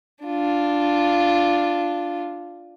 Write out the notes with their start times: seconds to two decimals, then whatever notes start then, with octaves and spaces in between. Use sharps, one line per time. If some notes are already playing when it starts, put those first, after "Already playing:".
0.25 D4 F4